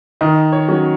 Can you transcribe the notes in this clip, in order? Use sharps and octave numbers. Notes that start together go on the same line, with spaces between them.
D#3 D#5
C#5
F#3 C#4